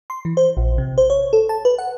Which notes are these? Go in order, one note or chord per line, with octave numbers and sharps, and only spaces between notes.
C6
E3
C5
A#1
C3
C5
C#5
A4
A5
B4
F#5